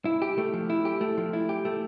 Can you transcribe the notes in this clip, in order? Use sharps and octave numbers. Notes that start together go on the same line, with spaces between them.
E4
G4
A3
F3
E4
G4
A3
F3
E4
G4
A3